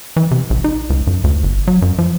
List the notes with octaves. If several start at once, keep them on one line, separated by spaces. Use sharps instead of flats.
E3
C3
A#1
D#4
C#2
F#2
D2
G1
F#3
F#2
F3